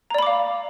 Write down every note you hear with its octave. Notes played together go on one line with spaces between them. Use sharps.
D5 F5 A#5 B5 D6